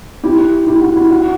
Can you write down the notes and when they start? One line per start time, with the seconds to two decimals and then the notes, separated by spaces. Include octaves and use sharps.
0.24 E4 G4
0.67 E4 G4
0.82 F#4
0.96 E4
1.10 F#4